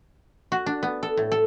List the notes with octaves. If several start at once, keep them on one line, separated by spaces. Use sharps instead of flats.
F#4
D4
B3
A4
A2
A4